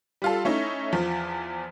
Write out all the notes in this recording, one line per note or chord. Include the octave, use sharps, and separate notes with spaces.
G3 F4 A4
A3 C#4 D#4 E4
E2 F3